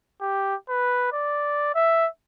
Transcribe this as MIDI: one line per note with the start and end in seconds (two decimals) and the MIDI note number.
0.21 0.55 67
0.69 1.10 71
1.12 1.70 74
1.75 2.07 76